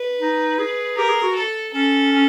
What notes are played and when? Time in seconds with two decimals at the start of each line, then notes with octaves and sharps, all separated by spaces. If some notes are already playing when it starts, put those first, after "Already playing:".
Already playing: B4
0.19 D#4
0.59 G#4
0.97 G4 A#4
1.09 G#4
1.23 F#4
1.35 A4
1.73 C#4 A4
2.12 C#4